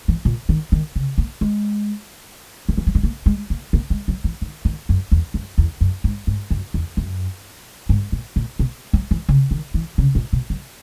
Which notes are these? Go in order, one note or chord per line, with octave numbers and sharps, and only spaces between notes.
E3
A#2
D#3
D#3
C#3
A#3
G#3
D#3
E3
F#3
G#3
A#3
G#3
A#3
A#3
G#3
F#3
E3
D#3
D#3
F#2
E2
F#2
E2
F#2
G#2
G#2
F#2
E2
F#2
G#2
A#2
A#2
B2
F#3
E3
C#3
D#3
E3
C#3
A#2
B2
F#3